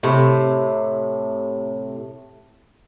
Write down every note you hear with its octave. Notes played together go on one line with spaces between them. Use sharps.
A2 C3